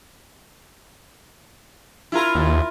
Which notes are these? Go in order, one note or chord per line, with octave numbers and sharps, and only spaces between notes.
E4 F4 A#4
D#2